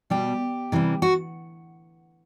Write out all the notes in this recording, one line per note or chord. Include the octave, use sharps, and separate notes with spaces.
B2 G3 G4
C3 E3 G3
F#4